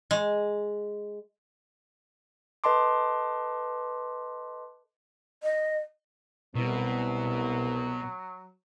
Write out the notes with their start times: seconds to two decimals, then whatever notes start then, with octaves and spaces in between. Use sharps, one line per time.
0.11 G#3
2.64 A4 B4 D#5 A5 C6 D6
5.43 D#5
6.55 C2 B2 F#3 B3